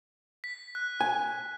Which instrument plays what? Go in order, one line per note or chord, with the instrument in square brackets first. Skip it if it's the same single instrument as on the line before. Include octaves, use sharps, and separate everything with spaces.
[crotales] B6
F#6
[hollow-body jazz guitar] G#5